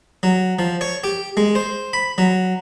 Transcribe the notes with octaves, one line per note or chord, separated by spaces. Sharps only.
F#3
F3
C#5
G4
G#3
C5
B5
F#3